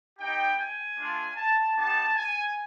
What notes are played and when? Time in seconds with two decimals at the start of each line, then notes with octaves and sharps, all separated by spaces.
0.19 B3 D#4 G4 G5
0.58 G#5
0.97 A3 D4 F4
1.36 A5
1.75 B3 D#4 G4 A5
2.14 G#5